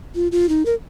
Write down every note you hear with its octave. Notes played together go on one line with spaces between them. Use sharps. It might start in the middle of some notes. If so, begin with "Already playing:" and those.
F4
F4
D#4
A#4